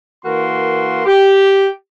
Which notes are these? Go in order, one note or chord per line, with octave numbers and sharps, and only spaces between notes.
E3 A#3 F#4 A#4 C6
G4